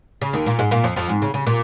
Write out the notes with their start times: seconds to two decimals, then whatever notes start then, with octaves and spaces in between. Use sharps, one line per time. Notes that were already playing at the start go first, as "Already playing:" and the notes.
0.22 C#3
0.33 D#2 D#3
0.46 A#2 A#3
0.59 G#2 G#3
0.71 A#2 A#3
0.84 F2 F3
0.96 F2 F3
1.09 G#2
1.22 C#3
1.34 C#3
1.46 A#2